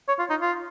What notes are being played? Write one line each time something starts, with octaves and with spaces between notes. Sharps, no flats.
C#5
F4
D#4
F4